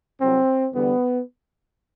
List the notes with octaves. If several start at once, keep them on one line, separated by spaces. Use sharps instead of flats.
C2 C3 F#3 C4
E2 D3 G3 B3